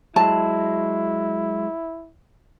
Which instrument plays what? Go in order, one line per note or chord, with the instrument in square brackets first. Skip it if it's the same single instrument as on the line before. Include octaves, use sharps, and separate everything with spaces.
[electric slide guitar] F#3 G#3 [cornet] E4 [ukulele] A5